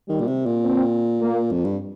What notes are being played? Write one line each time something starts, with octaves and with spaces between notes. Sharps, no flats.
D#3 G3
A#2
C3
A#2
C4
A#3
F2
G2